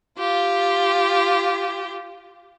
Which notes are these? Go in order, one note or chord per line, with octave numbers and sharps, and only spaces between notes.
F4 G4